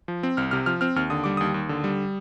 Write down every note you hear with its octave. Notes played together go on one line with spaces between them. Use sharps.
F3
C4
C2 F6
C3 F6
F3 F6
C4 F6
D#2 F6
D3 D#6
G3 D6
D#2 D#6
D#2
D3
G3